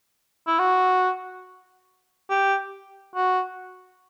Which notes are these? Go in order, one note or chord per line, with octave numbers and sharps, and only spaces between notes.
E4
F#4
G4
F#4